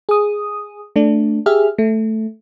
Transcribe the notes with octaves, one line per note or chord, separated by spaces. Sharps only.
G#4 D#6
A3 D4
G4 G#4 E5 F6
A3